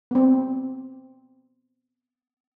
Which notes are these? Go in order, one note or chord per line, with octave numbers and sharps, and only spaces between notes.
B3 C4